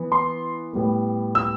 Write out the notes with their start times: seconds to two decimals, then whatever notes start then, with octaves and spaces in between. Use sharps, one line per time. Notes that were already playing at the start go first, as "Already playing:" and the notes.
Already playing: E3 B3
0.12 C6
0.73 A2 G3 B3
1.35 E6